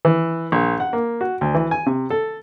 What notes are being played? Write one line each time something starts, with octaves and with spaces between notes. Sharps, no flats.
E3
A#1
F#5
A#3
F#4
D2
E3
G#5
C3
A4